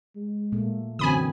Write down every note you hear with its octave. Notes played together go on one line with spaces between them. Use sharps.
G#3
A#2 A3 A#3
F#2 D3 E3 C4 G#5 B5 D#6